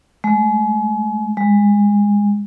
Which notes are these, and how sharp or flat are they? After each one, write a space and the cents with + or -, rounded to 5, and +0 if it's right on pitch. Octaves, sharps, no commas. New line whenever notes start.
G#3 +35
G#3 -20